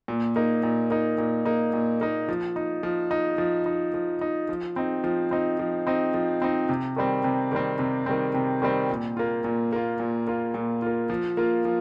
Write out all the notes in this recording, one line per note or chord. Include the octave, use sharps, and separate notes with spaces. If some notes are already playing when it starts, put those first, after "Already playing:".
A#2
A#3 D#4
A#2
A#3 D#4
A#2
A#3 D#4
A#2
A#3 D#4
F3
D#4
F3
D#4
F3
D#4
F3
D#4
F3
C4 D#4
F3
C4 D#4
F3
C4 D#4
F3
C4 D#4
C3
D#3 G3 C4
C3
D#3 G3 C4
C3
D#3 G3 C4
C3
D#3 G3 C4
A#2
A#3 F4
A#2
A#3 F4
A#2
A#3 F4
A#2
A#3 F4
F3
A#3 F4
F3